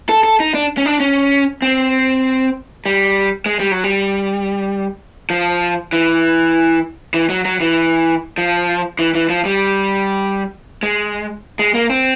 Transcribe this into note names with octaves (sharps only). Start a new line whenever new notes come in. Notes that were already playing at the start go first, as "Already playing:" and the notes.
A4
A4
D#4
D4
C#4
D4
C#4
C4
G3
G#3
G3
F#3
G3
F3
E3
E3
F#3
F#3
E3
F3
E3
E3
F3
G3
G#3
G#3
A#3
C4